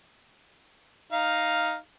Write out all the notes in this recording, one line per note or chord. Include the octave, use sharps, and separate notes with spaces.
D#4 F5